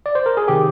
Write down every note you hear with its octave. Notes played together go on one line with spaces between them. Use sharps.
D5
C5
A#4
G#4
C3 D#3 G4